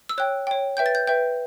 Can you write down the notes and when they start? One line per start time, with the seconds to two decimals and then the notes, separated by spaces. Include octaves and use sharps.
0.09 E6
0.18 C#5 G5 F#6
0.47 C#5 G5
0.77 B4 E5 G5 G6
0.86 A6
0.95 G6
1.07 B4 E5 G5 G6